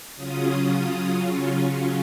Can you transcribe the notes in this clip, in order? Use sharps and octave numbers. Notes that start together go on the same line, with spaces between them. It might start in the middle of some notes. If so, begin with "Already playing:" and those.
C#3 F#3 C#4 F4 D#6